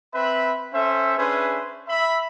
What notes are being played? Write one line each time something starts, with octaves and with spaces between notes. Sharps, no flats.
C4 B4 E5 B5
C#4 A4 C5 E5
C#4 D4 G#4 B4 C5 E5
E5 B5